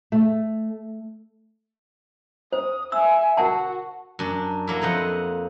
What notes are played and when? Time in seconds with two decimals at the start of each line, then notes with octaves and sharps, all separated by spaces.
0.12 A3
2.53 C5 D#6
2.92 E5 G#5 E6
3.37 F#4 A#4 F#5 A5
4.19 F#2 D4
4.67 F#3 A#3 E4
4.82 F2 C4 D#5 F#5